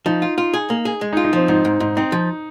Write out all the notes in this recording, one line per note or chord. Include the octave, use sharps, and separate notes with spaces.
F3 D#4
F4
F4
G#4
A#3
G#4
G#3
D#4
F4
D#4
F3 C4
G#2 D#4
G#2
G#2 D#4
C4 D#4
F3